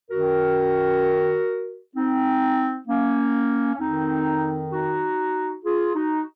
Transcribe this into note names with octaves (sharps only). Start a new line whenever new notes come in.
F#2 D#3 F#4 A#4
C4 D#4
A#3 C#4
C#4
F2 D#3 C4 D#4
D#4 F#4
F4 G#4
D#4 F#4